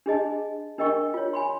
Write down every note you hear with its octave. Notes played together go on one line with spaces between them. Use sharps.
D4 G#4 D#5 A5
D4 A#4 D#5 G5 C#6
F4 C#5
G#5 B5 C6